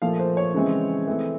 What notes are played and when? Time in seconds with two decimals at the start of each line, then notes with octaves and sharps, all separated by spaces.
0.02 A#2 F3 A3 F5
0.19 C5
0.37 C#5
0.54 C#3 E3 G#3 C4
1.07 E3 A3 C4